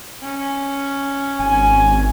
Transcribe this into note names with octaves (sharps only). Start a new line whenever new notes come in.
C#4
G#1 G#5